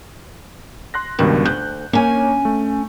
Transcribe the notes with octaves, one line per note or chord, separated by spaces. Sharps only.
C6 F#6 A#6
C#2 G2 B2 D#3
D2 F#6 G6
A#3 C#4 C#5 G#5
A3